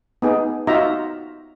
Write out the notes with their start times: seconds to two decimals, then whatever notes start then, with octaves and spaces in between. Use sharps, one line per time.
0.22 B3 D#4 G#4
0.67 D#4 F4 F#4 E5 A#5